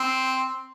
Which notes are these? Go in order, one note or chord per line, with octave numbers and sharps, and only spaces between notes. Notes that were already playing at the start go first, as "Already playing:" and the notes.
Already playing: C4